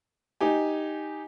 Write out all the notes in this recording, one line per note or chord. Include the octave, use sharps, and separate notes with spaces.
D#4 G4 G#5